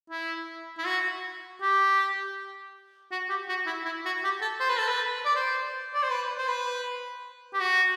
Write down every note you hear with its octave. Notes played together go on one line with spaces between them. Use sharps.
E4
E4
F#4
G4
F#4
G4
F#4
E4
E4
F#4
G4
A4
C5
B4
A4
B4
D5
C5
D5
C5
B4
C5
B4
G4
F#4